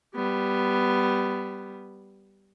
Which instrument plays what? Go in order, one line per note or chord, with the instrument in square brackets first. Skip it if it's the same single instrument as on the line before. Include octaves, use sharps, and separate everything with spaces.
[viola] G3 B3